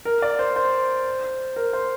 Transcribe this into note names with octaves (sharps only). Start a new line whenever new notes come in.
A#4
D5
C5
C5
A#4
C5